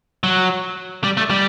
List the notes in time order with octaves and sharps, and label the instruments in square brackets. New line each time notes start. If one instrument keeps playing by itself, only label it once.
[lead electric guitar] F#3
G3
A3
G3